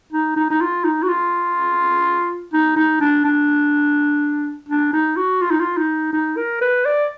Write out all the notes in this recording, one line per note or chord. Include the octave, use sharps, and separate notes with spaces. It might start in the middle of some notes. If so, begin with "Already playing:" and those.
D#4
D#4
D#4
F4
D#4
F#4
F4
D#4
D#4
D4
D4
D4
D#4
F#4
F4
D#4
F4
D#4
D#4
A#4
B4
D5